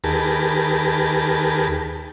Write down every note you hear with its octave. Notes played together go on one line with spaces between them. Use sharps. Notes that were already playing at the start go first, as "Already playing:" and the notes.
D#2 G4 G#4 A#4 B4 A5